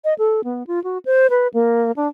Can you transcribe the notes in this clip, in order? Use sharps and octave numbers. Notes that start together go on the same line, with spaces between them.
D#5
A4
B3
F4
F#4
C5
B4
A#3
D4